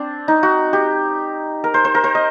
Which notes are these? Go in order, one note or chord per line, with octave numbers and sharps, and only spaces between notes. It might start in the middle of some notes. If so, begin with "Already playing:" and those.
Already playing: C4 D4
D#4
F#4
G4
A#4
C5
C5
A#4
C5
D#5